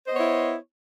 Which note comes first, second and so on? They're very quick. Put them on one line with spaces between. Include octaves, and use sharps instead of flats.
C5 D#5 B3 C#5 E4